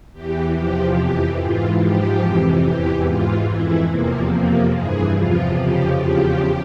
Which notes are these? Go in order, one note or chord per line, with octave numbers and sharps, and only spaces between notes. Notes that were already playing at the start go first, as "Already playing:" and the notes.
E2 E3 G4
E2 C3 F3 G4
F2 E3 G4
G#2 E3 F4
G#2 F3 G4
F2 C3 E3
E2 E3 G4
G#2 E3 F4
F2 E3 E4
E2 C3 F3 A#3
F2 C3 F3 A#3
G2 E3 G#4
E2 C3 F3 F4
F2 C#3 F3 G4
E2 C#3 F3 G4